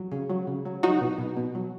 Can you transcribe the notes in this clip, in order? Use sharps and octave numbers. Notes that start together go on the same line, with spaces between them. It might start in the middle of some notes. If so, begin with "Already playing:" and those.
Already playing: F#3
C#3
F#3
C#3
F#3
F#3 D#4 F#4
B2
B2
B2
F#3